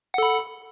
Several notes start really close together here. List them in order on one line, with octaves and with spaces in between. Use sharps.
F#5 A4 B5